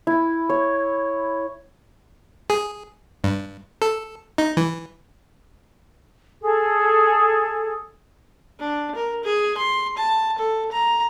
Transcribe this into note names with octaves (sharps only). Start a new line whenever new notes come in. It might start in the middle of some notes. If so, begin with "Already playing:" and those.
E4
C#5
G#4
G2
A4
D#4
E3
G#4 A4
D4
A#4
G#4
C6
A5
A4
A#5